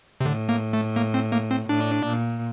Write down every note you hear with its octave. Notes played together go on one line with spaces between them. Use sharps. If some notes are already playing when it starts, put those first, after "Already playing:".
C3
A2 D3
A#3
A3
A#3
C4
A#3
C4
A2 D4
A#2